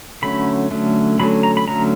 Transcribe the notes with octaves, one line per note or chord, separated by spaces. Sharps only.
D3 F#3 A3 C#4 B5
D3 F#3 A3 C#4
D3 F#3 A3 C#4 B5
A#5
B5
D3 F#3 A3 C#4 A#5